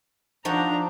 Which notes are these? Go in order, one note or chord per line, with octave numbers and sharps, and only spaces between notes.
F3 D4 D#4 F#4 A#5